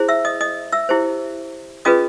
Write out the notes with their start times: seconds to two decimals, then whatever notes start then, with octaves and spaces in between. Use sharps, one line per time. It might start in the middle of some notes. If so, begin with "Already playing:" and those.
Already playing: E4 G#4 C5
0.08 E5 E6
0.25 D#5 D#6
0.41 D#5 D#6
0.72 E5 E6
0.89 E4 G4 C5
1.85 C#4 F4 G#4 B4 D#5 D#6